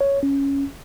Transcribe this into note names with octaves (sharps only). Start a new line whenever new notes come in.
C#5
C#4